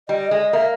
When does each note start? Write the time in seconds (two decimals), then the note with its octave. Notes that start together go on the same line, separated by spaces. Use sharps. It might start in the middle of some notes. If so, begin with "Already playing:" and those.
0.09 G3 D#5
0.31 G#3 D#5
0.53 A#3 E5